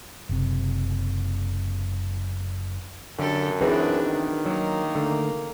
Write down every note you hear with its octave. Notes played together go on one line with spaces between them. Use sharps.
F#1 C3
F#2 D3 G4 A4
E3 C4 D4 D#4 F#4 G#4 B4 E5
D#3
F#3 A#3
D3 A3